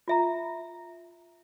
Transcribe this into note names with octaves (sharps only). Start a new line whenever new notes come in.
F4 E5 A#5